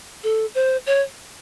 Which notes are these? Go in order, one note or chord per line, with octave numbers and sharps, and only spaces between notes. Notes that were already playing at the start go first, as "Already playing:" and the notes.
A4
C5
C#5